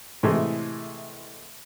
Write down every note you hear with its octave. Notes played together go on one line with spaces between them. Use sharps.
A2 C3 E3 G#3 A3